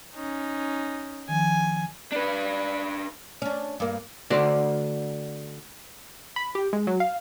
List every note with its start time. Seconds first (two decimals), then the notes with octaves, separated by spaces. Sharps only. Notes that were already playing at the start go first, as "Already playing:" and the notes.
0.15 C#4 D#4
1.28 D#3 F3 G#5
2.12 D4 B4
3.42 C#4 D4
3.80 G2 A#3
4.30 D3 A3 F#4 C5 D5
6.36 B5
6.55 G4
6.73 G#3
6.87 F#3
7.00 F5